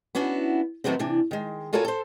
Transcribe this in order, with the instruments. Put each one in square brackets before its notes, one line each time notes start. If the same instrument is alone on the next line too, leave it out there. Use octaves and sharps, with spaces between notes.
[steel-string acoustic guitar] B3 C#4 D4 E4 F#4
D#3 E3 F#3 A3 B3 C4
C3 E3 D4
D#3 G#3
F4 F#4 A4 A#4 C#5 G#5
A4 C5